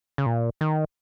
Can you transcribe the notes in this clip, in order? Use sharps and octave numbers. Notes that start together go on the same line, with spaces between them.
C#3
A#2
D#3